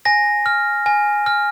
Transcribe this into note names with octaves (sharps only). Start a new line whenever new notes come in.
G#5 A#6
F6
G#5
F6